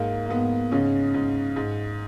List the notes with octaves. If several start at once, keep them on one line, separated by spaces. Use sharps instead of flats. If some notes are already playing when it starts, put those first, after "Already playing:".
Already playing: G#2 A#3
A#3
G#2 B3
G#2 C#3 C#4
G#2
G#2